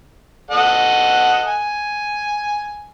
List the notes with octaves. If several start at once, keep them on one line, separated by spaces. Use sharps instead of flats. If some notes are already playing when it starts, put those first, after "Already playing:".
A4 D#5 F#5
G#5